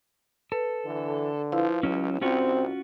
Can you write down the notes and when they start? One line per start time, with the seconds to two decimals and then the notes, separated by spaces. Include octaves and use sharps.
0.52 A4 B4
0.86 D3 E3
1.52 F3 E4 B4 F5
1.83 C#2 F#3 C#4
2.21 C2 C4 C#4 F4 F#4